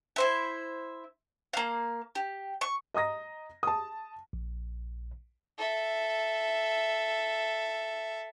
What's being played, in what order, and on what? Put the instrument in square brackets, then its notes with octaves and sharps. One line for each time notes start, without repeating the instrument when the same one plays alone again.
[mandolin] E4 C5 E5
A#3 F5
G4
C#6
[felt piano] D#5 A#5 D#6 A#6
A5 D#6
[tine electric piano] A#1
[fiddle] A4 E5